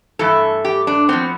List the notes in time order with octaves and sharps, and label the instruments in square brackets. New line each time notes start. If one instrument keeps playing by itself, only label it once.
[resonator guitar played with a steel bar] G2 E3 A3 A4
G4
D4
A2 F3 B3 C4